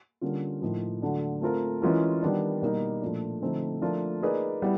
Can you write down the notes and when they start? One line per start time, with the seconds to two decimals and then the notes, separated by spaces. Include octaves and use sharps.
0.21 D3 G3 A#3 C#4 F4
0.62 A2 F3 A#3 D#4
1.02 D3 F#3 A3 D4
1.41 A3 C4 F4 A#4
1.82 E3 G#3 C#4 F4 A#4
2.22 D#3 G3 B3 D4
2.62 B2 G3 A#3 D#4 G4
3.02 A#2 F3 A3 D4
3.42 D3 F3 A3 C4 D#4
3.82 F3 A3 D4 F4 A#4
4.22 A#3 D#4 G#4 B4 D5
4.62 G3 B3 E4